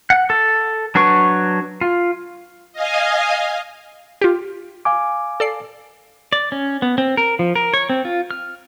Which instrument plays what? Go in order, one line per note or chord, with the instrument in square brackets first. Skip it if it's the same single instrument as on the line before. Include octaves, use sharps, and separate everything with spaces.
[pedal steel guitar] F#5
A4
F#3 D4 B4 C#6
F4
[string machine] D#5 F5 G#5
[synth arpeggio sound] F4 G4
[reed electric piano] F5 G#5 D6
[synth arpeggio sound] A4 D5 C7
[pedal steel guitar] D5
C#4
B3
C4
A#4
F3
A#4
C#5
C4
F4
F6